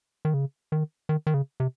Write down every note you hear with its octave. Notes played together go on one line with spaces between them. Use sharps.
D#3
C#3
D#3
D#3
D#3
C#3
C3